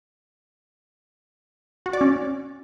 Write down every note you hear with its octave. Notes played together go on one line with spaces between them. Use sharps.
F#4
D5
C#4